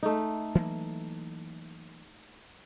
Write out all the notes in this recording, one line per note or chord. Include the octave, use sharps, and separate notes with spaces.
A3 D#4
E3 F#3 A#3